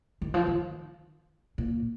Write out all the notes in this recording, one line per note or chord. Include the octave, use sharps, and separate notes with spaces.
D#3
F3
D#3
A#2